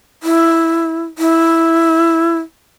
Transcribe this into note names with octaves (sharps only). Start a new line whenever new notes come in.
E4
E4